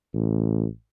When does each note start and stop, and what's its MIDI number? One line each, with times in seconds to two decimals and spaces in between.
0.14 0.66 33